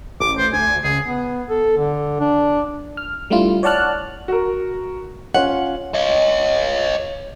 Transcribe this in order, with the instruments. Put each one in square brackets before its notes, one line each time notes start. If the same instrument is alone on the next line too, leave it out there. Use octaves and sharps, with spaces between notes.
[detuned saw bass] A1 [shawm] D6
[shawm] C5
[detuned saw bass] D2 [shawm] G#5
[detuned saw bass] C#2 [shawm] G#4
[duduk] B3
A4
D3
D4
[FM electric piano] F6
G3 A3 D4 E4 F4
C#5 D5 F#5 A5 F6 F#6
[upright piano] F#4 A#4
[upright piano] C#4 F4 [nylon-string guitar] F#5
[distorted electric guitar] C#5 D#5